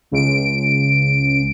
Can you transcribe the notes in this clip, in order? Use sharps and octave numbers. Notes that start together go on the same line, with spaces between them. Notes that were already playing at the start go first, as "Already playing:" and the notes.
C#2 D7